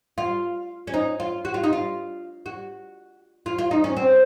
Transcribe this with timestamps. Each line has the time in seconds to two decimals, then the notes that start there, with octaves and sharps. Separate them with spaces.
0.18 F4
0.87 C#4
0.94 D#4
1.20 F4
1.45 F#4
1.54 F4
1.64 D#4
1.73 F4
2.46 F#4
3.46 F4
3.59 F4
3.71 D#4
3.84 C#4
3.96 C4